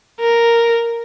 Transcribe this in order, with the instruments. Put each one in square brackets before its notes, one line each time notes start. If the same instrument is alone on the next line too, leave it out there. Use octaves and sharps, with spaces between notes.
[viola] A#4